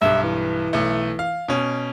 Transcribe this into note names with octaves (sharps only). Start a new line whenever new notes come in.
B1 G2 E5
E3
B1 A3
F5
B2 C#4